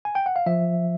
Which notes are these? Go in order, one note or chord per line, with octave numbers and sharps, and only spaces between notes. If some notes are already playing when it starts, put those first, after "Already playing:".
G#5
G5
F#5
F5
F3 E5